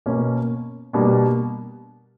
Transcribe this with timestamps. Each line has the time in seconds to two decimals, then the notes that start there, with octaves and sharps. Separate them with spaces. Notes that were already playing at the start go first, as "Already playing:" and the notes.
0.06 B2 A#3 C#4
0.93 B2 G3 A#3 D4